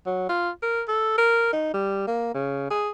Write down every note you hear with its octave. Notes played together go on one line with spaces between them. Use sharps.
F#3
F4
A#4
A4
A#4
D#4
G3
A#3
C#3
G#4